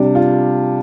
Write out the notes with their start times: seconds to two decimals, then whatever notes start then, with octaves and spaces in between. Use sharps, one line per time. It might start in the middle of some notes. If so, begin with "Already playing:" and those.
Already playing: C3 G3 D4
0.15 F4